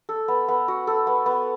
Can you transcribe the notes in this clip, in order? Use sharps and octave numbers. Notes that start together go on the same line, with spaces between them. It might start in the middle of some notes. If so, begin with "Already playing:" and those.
A4
B3
B3
F#4
A4
B3
B3